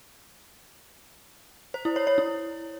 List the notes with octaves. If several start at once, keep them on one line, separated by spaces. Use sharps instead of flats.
C5
E4
C#5
C#5
E4